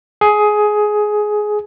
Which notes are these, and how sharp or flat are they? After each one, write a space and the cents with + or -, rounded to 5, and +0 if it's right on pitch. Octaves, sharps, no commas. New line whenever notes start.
G#4 +15